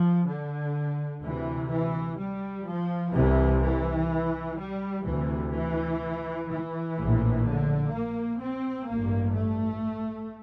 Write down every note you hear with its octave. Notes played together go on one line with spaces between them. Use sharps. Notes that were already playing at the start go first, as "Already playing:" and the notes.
Already playing: F3
D3
D2 C3 E3
E3
G3
F3
C2 C3 E3
E3
G3
D2 C3 E3
E3
E3
A#1 A2
D3
A#3
C4
A1 G2 A#3
A3